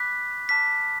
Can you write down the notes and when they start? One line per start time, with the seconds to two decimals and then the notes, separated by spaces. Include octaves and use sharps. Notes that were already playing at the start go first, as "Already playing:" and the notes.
Already playing: B5 D6 F#6 B6
0.49 A5 D6 F6 B6